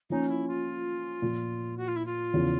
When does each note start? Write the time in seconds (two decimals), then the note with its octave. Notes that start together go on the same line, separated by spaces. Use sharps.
0.10 F3 A#3 C#4 D#4
0.28 E4
0.47 F4
1.22 A#2 F3 A#3
1.77 F#4
1.88 F4
1.96 E4
2.06 F4
2.34 E2 C#3 F3